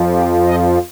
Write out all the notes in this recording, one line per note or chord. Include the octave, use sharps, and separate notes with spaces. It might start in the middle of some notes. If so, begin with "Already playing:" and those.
Already playing: F2 F3
G4
D#5